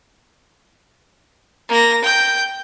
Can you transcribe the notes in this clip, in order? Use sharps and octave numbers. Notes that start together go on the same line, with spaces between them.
A#3 A#6
G5 G6